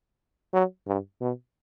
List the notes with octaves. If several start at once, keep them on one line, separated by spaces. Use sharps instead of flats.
F#3
G2
B2